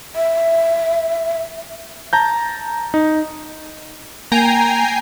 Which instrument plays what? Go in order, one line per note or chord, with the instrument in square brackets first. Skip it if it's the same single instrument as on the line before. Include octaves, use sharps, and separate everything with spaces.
[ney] E5
[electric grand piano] A5 A#5 G6
D#4
[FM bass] A#3 [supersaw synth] G5 G#5 C7 [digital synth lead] A#5